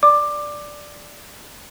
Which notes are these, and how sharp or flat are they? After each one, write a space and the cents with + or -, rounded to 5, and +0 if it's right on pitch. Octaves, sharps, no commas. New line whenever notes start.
D5 +0 D6 +15